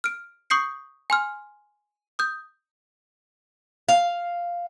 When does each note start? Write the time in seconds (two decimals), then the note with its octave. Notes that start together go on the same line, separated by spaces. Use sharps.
0.04 F6 D7
0.50 C#6 D#6 G6 C7 C#7
1.10 G#5 C6 F6
2.19 D#6 G6
3.89 F5